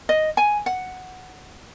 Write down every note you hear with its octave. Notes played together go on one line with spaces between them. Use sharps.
D#5
G#5
F#5